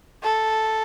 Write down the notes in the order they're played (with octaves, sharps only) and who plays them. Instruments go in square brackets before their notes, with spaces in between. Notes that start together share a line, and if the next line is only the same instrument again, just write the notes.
[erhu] A4